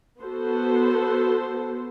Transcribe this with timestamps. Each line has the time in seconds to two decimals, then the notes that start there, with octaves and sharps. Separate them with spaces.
0.18 B3 F#4 A4 C5